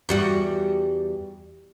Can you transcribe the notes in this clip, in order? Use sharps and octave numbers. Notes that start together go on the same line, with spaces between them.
E2 G3 F#4